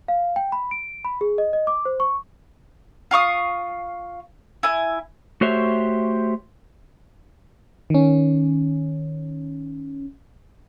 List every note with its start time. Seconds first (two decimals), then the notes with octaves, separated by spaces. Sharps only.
0.08 F5
0.36 G5
0.52 B5
0.71 D7
1.05 B5
1.21 G#4
1.38 D#5
1.53 D#5
1.67 D6
1.85 C5
2.00 C#6
3.11 F4 F5 C#6 D#6
4.63 E4 G#5
5.41 A3 F#4 G4 C5 C#5 E5
7.90 D#3 C#4